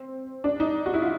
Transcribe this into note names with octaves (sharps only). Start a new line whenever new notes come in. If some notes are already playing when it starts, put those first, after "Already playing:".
Already playing: C4
D4
D#4
F#4
E4
F4